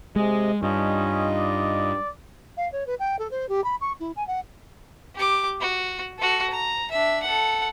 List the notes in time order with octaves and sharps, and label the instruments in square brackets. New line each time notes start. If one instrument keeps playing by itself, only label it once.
[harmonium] C3 D#5 [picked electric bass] G#3
[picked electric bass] G2 [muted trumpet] C#4 [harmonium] D#4 F4 D#5
[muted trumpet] D5
[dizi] F5
C#5
B4
G5
A4
C5
G4
B5
C#6
E4
G#5
F#5
[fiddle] G4 D6
F#4
F#4 A4
A#5
D4 E5
A4 F#5